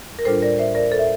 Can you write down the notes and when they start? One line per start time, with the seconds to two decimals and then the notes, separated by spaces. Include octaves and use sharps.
0.19 A#4
0.25 A2 G3 D4 F4 A4 C5
0.42 A#4 D5
0.59 C5 E5
0.75 A#4 D5
0.91 A4 C5
0.99 E5